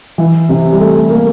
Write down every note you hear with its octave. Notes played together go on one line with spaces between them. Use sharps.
E3
C3
G3
A3
A#3